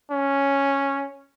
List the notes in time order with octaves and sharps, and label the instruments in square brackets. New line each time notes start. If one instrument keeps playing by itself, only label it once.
[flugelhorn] C#4